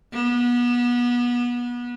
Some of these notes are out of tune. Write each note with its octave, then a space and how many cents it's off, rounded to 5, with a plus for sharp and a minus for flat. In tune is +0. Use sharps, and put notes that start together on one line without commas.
B3 -25